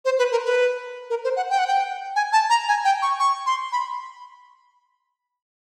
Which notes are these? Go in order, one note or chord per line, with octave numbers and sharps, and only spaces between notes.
C5
B4
A#4
B4
A#4
C5
F#5
G5
F#5
G5
G#5
A5
A#5
G#5
G5
C#6
C#6
C6
B5